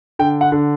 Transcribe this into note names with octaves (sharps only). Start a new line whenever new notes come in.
D3 G5
F#5
D3